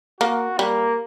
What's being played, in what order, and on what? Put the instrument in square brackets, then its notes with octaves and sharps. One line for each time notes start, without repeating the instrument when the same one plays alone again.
[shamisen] A#3 [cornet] F#4
[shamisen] G3 [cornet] A#3